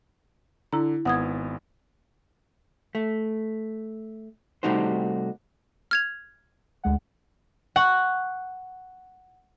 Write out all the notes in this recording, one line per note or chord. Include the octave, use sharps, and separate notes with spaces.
D3 E4 A#5
G#1 B3 F#5 D#6 G#6
A3
C3 G3 A3 D#4 F#4 C5
F6 G#6 F7
D2 G#3 F#5
F#5 C#6